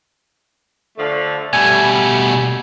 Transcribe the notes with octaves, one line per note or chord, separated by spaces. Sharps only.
D3 F3 A3
B2 G3 A3 G#5